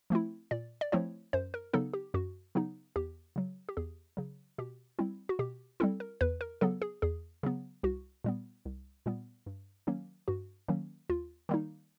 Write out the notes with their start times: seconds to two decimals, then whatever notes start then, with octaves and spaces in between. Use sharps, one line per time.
0.10 F3 A3 C4 E4
0.51 A#2 D5
0.81 D5
0.92 F3 A3 C4 E4 C#5
1.33 F#2 C5
1.54 A#4
1.73 C#3 F#3 B3 D#4 A4
1.94 G4
2.14 F#2 F#4
2.55 C#3 F#3 B3 D#4
2.96 E2 G4
3.36 C#3 F#3
3.69 G4
3.77 E2 G#4
4.17 C#3 F#3
4.58 B2 G4
4.99 G3 C4 E4
5.29 F#4
5.39 B2 G4
5.80 G3 C4 E4 A4
6.00 A#4
6.21 E2 B4
6.41 A#4
6.61 C#3 F#3 B3 A4
6.82 G#4
7.02 E2 G#4
7.43 C#3 F#3 B3
7.83 C2 F#4
8.24 A#2 G3 B3
8.65 C2
9.06 A#2 G3 B3
9.46 G2
9.87 D#3 F#3 A#3 C#4
10.28 G2 F#4
10.68 D#3 F#3 A#3 C#4
11.09 D#2 F4
11.49 D#3 G3 A#3 D#4